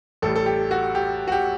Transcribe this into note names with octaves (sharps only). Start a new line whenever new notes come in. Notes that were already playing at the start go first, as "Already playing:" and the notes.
A1 A2 G3 A4
A4
G4
F#4
G4
F#4
G4